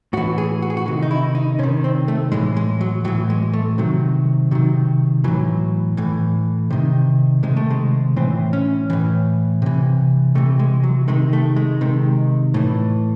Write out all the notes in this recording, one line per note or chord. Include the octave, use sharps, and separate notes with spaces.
A2 E3 F#4
G#4
F#4
G#4
F#4
C3 D#3
D#4
E4
D#4
C3 D#3 C#4
C4
A3
A2 E3 G#3
G#3
F#3
A2 E3 F#3
G#3
A3
C3 D#3 F#3
C3 D#3 F#3
A2 E3 F#3
A2 E3
C3 D#3
C3 D#3 G#3
A3
G#3
A2 E3 C4
C#4
A2 E3
C3 E3
C3 E3 A3
G#3
F#3
C3 D#3 G#3
A3
G#3
C3 D#3
A2 E3